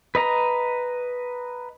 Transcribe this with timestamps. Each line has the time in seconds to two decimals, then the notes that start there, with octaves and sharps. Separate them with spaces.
0.15 B4 D#5 A#5